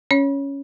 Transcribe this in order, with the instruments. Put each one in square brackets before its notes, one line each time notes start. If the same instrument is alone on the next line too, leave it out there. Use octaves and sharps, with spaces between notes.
[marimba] C#4 C#5